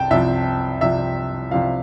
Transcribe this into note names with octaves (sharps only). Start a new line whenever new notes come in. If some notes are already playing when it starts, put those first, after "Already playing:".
Already playing: C2 C3 G5 A5
C2 C3 F3 E5
C2 C3 F3 E5
C2 C3 F3 F5